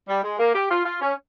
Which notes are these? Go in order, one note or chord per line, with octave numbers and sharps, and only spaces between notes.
G3
G#3
A#3
G4
F4
F4
C#4